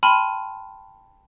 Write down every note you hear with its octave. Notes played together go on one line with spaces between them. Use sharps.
G5 A5 B5 C6 F6 D#7